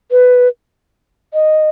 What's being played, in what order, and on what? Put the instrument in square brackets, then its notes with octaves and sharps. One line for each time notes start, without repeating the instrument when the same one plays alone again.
[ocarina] B4
D#5